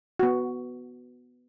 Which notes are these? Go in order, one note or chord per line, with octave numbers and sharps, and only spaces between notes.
B3 F#4